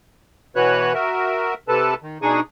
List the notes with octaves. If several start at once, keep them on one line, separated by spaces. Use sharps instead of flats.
B2 E3 F#4 B4 C#5 F#6
F#4 A#4 E5
C3 A4 B4 A5
D#3
B2 D4 D#4 G#4 C#6 D#6